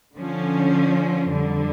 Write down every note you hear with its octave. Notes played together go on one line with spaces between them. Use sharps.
D3 F3 C#4
F2 D3 G3